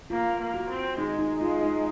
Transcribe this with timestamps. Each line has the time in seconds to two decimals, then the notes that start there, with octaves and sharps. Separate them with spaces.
0.10 A#3 F4
0.39 A#3
0.54 F#4
0.69 C4
0.98 G#3 D#4
1.19 D#4
1.41 G#3 F4
1.63 D#4